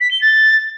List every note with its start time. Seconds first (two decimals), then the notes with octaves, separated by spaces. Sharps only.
0.01 B6
0.11 G7
0.22 A6